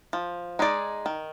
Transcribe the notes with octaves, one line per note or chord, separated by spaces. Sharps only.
F3
G#3 D#4 G#4 D5
D#3